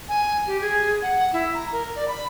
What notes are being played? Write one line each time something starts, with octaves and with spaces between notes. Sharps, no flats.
G#5
G4
G#4
F#5
E4
A#5
A#4
D5
B5